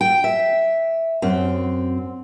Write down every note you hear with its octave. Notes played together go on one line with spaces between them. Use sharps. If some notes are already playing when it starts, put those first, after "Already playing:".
G5
E5
F#2 C4